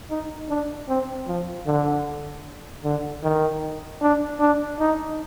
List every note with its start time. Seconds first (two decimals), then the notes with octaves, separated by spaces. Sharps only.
0.10 D#4
0.49 D4
0.88 C4
1.27 F3
1.66 D3
2.84 D3
3.23 D#3
4.01 D4
4.40 D4
4.80 D#4